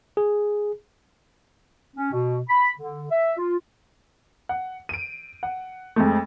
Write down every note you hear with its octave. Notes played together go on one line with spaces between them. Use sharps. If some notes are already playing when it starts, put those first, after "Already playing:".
G#4
C#4
B2
B5
D3
E5
F4
F#5
D7 D#7
F#5
F2 G#3 A3